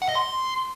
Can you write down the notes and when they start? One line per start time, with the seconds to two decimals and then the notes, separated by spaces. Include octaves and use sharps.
0.02 F#5
0.09 D#5
0.15 C6